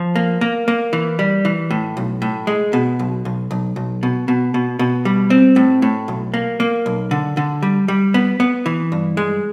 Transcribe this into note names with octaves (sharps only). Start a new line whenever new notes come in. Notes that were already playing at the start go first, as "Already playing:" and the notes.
Already playing: F3
A#3
A#3
A#3
E3
G3
E3
A2
B1
A2
G#3
B2
B1
B1
B1
B1
B2
B2
B2
B2
G3
C4
A2
A2
B1
A#3
A#3
B1
D3
D3
G3
G3
B3
B3
E3
G2
G#3